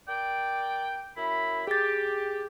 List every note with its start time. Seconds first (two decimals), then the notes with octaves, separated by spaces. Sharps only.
0.09 A#4 D5 G5
1.17 F#2 E4 B5
1.67 G4 G#4 A6